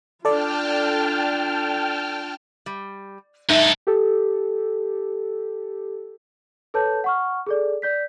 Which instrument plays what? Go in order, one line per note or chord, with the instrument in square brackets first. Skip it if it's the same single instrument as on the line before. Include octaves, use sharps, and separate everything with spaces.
[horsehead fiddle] D4 F4 [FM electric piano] A4 D5 [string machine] G5 A5 F6
[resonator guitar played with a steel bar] G3
[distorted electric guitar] G#2 A4 [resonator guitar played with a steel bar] D#4 E5
[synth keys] G4 A4
[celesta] A4 B4 C#5 A5 G6
F#5 C#6 F6
G#4 A4 D5
D5 G6 B6